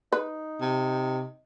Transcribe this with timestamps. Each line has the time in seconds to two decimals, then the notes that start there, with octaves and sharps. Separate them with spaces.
0.12 D#4 B4
0.61 C3